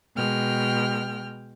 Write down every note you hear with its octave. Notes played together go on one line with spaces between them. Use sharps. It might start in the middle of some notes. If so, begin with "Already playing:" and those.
B2 G#3 G5 F6